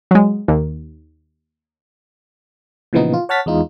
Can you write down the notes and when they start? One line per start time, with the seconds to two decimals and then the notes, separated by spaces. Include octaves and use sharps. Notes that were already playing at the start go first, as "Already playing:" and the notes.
0.11 F#3 G#3
0.48 D#2
2.93 A#2 C#3 E3 F3 B3 D#4
3.13 F4
3.29 C#5 F#5 A5 F6 A6 B6
3.46 E2 G#3 D#4 F4